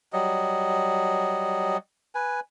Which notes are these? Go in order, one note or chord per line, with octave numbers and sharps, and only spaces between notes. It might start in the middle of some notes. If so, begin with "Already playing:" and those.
F#3 G3 D#5
B4 G#5